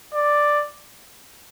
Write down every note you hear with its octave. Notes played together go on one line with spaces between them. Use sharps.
D5